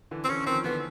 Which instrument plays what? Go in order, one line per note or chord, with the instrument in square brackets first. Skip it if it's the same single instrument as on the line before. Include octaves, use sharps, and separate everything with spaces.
[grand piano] D3 E3
[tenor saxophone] C4
[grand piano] D3 E3 [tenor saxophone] C#4
[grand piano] D#3 F3 [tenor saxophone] C4
[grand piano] D3 E3 [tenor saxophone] B3